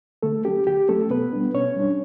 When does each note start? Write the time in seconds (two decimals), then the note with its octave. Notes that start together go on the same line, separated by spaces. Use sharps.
0.23 D3 A3 A4
0.45 F#3 C#4 G4
0.67 D3 G4
0.88 F#3 A3 C#4 A4
1.10 B2 B3 B4
1.33 G3 D4
1.54 B2 C#4 C#5
1.76 G3 D4